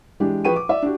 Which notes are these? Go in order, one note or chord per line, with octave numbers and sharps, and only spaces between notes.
E3 G#3 D4 G4
F3 G#4 B4 G5 C#6 D#7
D6
D5 E5
D4 F#4 G4